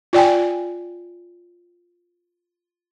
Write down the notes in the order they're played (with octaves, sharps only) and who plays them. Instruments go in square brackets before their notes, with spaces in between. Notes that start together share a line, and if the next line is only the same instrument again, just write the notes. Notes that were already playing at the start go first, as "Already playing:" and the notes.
[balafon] F4 D5 G5 G#5